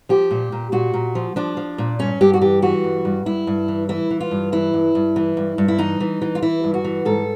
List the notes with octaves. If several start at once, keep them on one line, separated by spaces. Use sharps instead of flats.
F3 G4
A#2
A#2
A#2 F#4
A#2
F3
F3 D4
F3
A#2
G2 C#4
G2 G4
F#4
E3 G4
E3 F#4
G2
G2
G2 E4
G2
E3
E3 E4
E3
F4
G2
E3 E4
G2
G2
E3
G2
G2
E4
E3 D#4
E3
E3
F4
E3 E4
G2
F#4
E3
G#2 A4